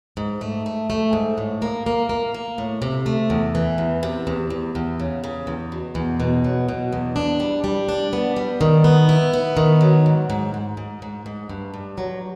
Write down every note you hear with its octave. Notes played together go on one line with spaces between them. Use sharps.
G#2
A3
A3
A3
G#2
A2
A#3
A#3
A#3
A#3
A2
C3
A3
E2
E3
E2
C3
E2
E2
E2
C#3
C#3
E2
B2
E2
B2
F#3
B2
E2
D4
G3
G3
D4
B3
G3
D#3
B3
E4
B3
D#3
F#3
G#2
G#2
G#2
G#2
G#2
G#2
G2
G2
F#3